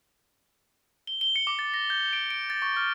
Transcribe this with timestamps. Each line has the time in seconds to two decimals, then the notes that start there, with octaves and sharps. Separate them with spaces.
1.07 G7
1.21 G7
1.36 C#7
1.47 D6
1.59 A6
1.74 A#6
1.90 G6
2.13 D7
2.30 D7
2.50 A6
2.62 C#6
2.77 F6